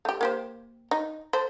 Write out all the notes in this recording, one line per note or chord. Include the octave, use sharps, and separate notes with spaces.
A3 G4
A#3 G4 C5
D#4
A4 C5